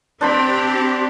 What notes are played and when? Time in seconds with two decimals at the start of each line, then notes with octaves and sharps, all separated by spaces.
0.21 C4 D4 G4 C5 B5